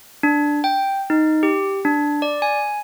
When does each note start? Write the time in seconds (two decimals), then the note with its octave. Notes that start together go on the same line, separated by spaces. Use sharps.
0.23 D4
0.64 G5
1.10 D#4
1.43 G4
1.85 D4
2.22 D5
2.42 G#5